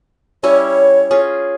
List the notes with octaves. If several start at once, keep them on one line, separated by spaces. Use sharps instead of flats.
G3 C#4 E4 C#5
C#4 F4 G#4